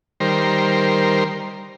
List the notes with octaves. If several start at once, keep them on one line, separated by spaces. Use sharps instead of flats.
D#3 G3 A#4 C5